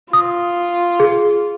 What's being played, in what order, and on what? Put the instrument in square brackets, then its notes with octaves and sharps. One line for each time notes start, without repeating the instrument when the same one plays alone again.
[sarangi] F4 [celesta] D#6
[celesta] G#4